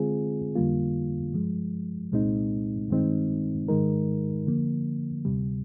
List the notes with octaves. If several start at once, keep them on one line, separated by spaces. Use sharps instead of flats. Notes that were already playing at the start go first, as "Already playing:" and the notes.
Already playing: D3 G#3 C4 F4 G#4
F2 D3 G3 A#3 F4
G2 F3 G#3
C2 A#2 G#3 C4 D#4
G2 D#3 G#3 C4 D#4
G#2 D#3 G#3 D#4 A#4
D3 F3 A#3
D2 C3 G3